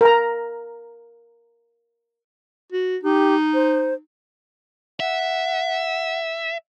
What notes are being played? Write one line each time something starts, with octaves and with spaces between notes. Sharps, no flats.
A#4 A#5
F#4
D#4 G4
C5
E5 F#5